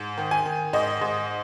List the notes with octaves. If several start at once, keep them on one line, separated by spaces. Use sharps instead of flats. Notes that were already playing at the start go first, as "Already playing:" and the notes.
Already playing: G#2
D#3
G#5
D#3
G#2 D#5
G#2